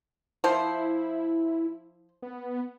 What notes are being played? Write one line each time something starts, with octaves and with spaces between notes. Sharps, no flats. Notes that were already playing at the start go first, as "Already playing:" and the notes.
F3 E4 C5
B3